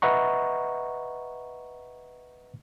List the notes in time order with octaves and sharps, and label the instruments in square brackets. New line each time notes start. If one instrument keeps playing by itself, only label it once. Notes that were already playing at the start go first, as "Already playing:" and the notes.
[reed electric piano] B4 D#5 E5 F#5 A#5 C#6